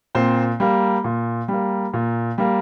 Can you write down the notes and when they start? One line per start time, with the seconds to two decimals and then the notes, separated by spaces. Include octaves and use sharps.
0.15 A#2 C4 C5
0.60 G3 A#3
1.04 A#2
1.48 G3 A#3
1.94 A#2
2.38 G3 A#3